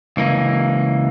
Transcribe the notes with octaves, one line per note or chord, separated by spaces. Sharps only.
C#2 E3 A#3